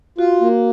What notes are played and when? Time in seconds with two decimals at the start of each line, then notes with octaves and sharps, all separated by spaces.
0.18 F4 F#4
0.41 A#3